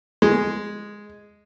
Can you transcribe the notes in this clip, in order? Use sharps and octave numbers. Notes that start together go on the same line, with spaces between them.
G#3